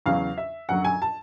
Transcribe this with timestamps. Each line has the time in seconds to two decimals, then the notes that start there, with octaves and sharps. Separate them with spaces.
0.06 E2 C#3 F#3 F5
0.38 E5
0.69 F#2 D3 F#3 F#5
0.85 G#5
1.02 A5